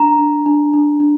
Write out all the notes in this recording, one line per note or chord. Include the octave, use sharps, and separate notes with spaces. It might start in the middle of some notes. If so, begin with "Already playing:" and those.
Already playing: D4 A#5
D4
D4
D4
D4